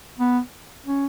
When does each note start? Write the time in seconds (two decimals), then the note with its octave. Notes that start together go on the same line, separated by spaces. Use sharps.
0.19 B3
0.86 C#4